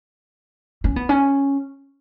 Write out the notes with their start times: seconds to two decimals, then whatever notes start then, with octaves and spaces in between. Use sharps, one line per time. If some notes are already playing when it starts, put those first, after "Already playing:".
0.84 C#4
0.96 B3
1.09 C#4